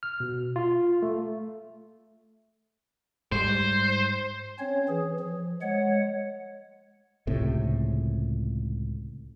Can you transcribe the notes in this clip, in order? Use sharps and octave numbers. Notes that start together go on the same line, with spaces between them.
F6
B2
F4
A3
G#2 G3 C5
C4 C#4 C#5
E3 G#4
F3
G#3 C#5 F#5
C#2 A2 C3